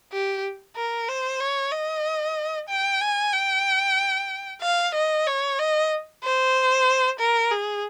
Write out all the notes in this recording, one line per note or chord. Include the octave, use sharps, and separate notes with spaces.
G4
A#4
C5
C#5
D#5
G5
G#5
G5
F5
D#5
C#5
D#5
C5
A#4
G#4